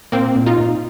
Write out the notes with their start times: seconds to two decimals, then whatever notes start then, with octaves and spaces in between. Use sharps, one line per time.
0.12 A#2 A#3 C4
0.36 A#2
0.46 D#4 F4
0.58 A#2